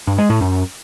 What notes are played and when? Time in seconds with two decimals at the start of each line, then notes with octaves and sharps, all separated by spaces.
0.07 G2
0.18 G#3
0.30 A2
0.41 F#2